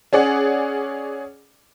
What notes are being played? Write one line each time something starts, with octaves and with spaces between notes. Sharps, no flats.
C#4 G#4 D5 F#5